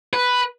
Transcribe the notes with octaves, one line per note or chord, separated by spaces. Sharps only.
B4